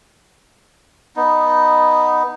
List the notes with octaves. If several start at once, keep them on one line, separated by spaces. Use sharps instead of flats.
B3 D#4